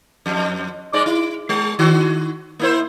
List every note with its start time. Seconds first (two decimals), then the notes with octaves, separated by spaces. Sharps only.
0.26 F2
0.93 G#2 G#3 D5
1.06 E4
1.49 G#3
1.79 D#3 F#4
2.59 A#3 E4 C5